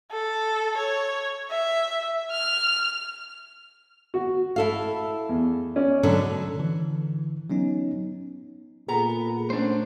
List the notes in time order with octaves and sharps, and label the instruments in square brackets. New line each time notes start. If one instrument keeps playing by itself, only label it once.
[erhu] A4
C#5
E5
F6
[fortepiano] F#4
[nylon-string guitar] E4 A4 F5
[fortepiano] E2
C#4 D5
[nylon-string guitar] B2 D3 F#3
[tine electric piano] D3 E3
F#3 B3 C#4 D#4
[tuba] A#2 [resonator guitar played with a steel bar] B3 A#5 [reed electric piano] G#4 A4
[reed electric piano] A3 C#4 [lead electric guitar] D4 C5